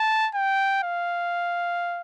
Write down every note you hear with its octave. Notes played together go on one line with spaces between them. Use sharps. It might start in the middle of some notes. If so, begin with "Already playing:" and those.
Already playing: A5
G5
F5